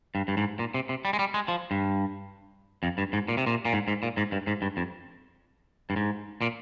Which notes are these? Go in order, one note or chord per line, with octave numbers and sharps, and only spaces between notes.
G2
G2
G#2
A#2
C3
C3
G3
G#3
G3
G#3
F3
G2
F2
G2
G#2
A#2
C3
A#2
A#2
G#2
G#2
A#2
G#2
G2
G#2
G2
F2
G2
G#2
A#2